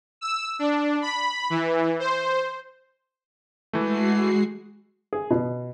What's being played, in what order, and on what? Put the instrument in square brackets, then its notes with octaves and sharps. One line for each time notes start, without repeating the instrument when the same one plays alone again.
[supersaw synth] E6
D4
B5
E3
C5
[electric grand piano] E3 A3 [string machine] G#3 F#4 C7
[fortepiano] G#4
B2